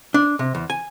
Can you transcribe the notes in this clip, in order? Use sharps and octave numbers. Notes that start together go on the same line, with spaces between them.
D4
C3
E2
G#5